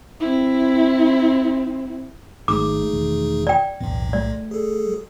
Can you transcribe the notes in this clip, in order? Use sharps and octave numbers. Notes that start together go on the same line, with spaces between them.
C4 E4
G#1 D#3 G#3 A3 D#4 G#4 D6
E1 D#3
D5 G5
E1 B1 A2 B3
G3 A3 D5
G#4 A4